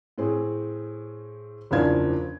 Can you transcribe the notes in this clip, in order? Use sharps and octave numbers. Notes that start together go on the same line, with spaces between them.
A2 C4 G#4
F#1 E2 F3 D4 F5 G#6